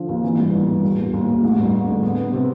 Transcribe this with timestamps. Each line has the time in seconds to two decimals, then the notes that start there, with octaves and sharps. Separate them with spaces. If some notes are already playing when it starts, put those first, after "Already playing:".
Already playing: D3 F3
0.09 D#2
0.24 E3
0.39 G2
0.53 G2
0.68 G2
0.83 E1
0.98 E1
1.13 D#2
1.28 E1
1.43 A1
1.59 G2
1.73 A1
1.88 D3
2.03 B3
2.18 B3
2.33 C3